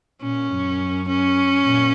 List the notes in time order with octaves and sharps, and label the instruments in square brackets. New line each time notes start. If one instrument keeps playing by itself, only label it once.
[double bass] A#2 [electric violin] C#4
[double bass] F#2
[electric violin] C#4
[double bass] A#2